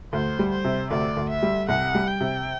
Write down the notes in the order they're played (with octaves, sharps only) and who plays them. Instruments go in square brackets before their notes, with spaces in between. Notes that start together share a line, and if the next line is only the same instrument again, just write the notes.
[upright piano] D2 [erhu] C5
[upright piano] G3
[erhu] C5
[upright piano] C3
[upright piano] D2 [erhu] D5
[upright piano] D2
[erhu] E5
[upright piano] G3
[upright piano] C2 [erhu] F#5
[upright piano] G3
[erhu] G5
[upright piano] C3